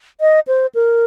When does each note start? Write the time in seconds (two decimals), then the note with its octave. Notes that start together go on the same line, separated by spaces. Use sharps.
0.21 D#5
0.47 C5
0.75 A#4